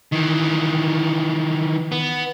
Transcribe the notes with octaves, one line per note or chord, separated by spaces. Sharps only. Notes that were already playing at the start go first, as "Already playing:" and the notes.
D#3 E3
B3